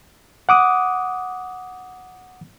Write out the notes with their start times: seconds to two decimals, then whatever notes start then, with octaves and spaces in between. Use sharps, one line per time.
0.49 F#5 D6 D#6